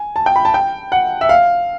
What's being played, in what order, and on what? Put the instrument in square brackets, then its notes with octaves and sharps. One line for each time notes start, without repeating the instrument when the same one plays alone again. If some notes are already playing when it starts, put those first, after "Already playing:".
Already playing: [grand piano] G#5
A5
G5
B5
A5
G5
F#5
E5
F5